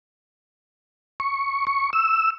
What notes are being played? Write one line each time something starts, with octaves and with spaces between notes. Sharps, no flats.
C#6
C#6
E6